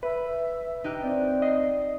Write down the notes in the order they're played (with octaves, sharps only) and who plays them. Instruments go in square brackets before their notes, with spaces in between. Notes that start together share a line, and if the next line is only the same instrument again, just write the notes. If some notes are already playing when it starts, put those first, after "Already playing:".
[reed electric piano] B4 [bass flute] E5
[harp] D#4 G4 F#6
[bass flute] C4 [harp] D5
[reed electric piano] D#5 [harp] C7